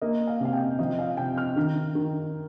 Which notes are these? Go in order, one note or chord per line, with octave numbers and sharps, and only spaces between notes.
A#3 D#5
F5
C3
F5
G5
F3 D#5
F5
C3 G5
F6
D#3
D#3